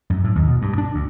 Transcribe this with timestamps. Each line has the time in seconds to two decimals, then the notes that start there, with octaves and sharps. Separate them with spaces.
0.10 F#2
0.24 A2
0.35 D#2
0.47 B2
0.62 G2
0.78 D4
0.94 D2